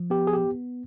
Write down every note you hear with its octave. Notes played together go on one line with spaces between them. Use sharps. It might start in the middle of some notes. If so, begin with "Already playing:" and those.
Already playing: F3
B3 G4
G#4
G4